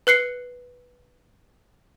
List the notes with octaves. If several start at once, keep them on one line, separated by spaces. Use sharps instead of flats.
B4 F#6 C7 C#7